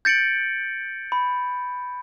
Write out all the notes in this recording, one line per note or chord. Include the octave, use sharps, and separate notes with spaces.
G6 A6 C#7 D7 F#7
B5